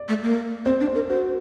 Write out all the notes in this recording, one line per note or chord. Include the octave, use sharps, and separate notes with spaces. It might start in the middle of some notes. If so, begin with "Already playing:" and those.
Already playing: D5
A3
A#3
C4 C5
D4
C5
A#4
F#4 C5